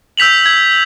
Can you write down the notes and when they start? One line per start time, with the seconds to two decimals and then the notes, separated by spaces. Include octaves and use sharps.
0.17 E6 G6 B6 F7 F#7
0.46 G#6